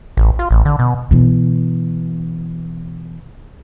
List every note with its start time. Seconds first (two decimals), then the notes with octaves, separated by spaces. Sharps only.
0.17 A1
0.39 F4
0.51 A1
0.65 D3
0.79 B2
1.11 B2 E3